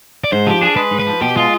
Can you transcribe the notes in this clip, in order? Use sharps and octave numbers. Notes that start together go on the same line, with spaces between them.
D5
G#2 C5
F3 G4
D4 G#4
G#3 B4
G#2
B4
F3
B2 G4
G#3 F4